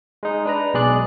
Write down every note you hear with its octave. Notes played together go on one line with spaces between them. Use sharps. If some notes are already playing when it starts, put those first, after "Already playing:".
G#3 D#4
D4 B4 A#5
B1 B2 G#3 G#4 D5 F#6